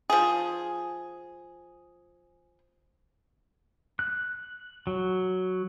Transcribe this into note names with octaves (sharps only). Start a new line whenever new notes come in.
F3 G#4
F#6
F#3